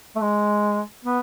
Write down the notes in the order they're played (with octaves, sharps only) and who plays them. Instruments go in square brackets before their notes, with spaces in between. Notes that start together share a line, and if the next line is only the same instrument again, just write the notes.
[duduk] A3
G#3
B3